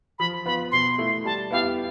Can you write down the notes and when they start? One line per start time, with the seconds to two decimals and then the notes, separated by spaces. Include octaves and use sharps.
0.19 F3 B5
0.46 B3 F4 B4 B5
0.72 B2 C6
0.98 A3 E4
1.25 G3 A5
1.51 B3 E4 G4 F5